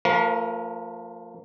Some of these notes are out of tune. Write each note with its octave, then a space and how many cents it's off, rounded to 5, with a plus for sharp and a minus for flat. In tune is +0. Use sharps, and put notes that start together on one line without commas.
F3 +0 A#3 -45 A#4 +30